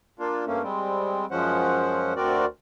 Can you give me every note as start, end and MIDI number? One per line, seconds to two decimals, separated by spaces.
0.19 0.45 58
0.19 0.45 62
0.19 0.45 65
0.46 0.62 43
0.46 0.62 57
0.46 0.62 58
0.46 0.62 61
0.62 1.26 55
0.62 1.26 56
0.62 1.26 60
1.31 2.13 42
1.31 2.13 53
1.31 2.13 56
1.31 2.13 61
1.31 2.13 72
1.31 2.13 78
2.16 2.45 38
2.16 2.45 60
2.16 2.45 66
2.16 2.45 70
2.16 2.45 74